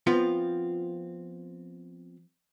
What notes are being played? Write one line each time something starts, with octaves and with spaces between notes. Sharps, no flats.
F3 B3 C4 F4